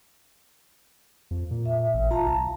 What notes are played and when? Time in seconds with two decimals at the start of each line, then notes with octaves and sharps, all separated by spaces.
1.31 F2
1.51 A#2
1.65 E5
1.94 A1
2.11 F4 F5 A5 A#5
2.27 C2